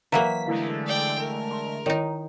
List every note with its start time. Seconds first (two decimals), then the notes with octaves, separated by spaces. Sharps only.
0.12 E3 F#3 A#3 F5 A#5 B6
0.46 D3 G#3 A3 E4 F5
0.87 D5 G5
1.19 A#4
1.51 C6
1.86 D#3 D#4 E4 C#5 D#6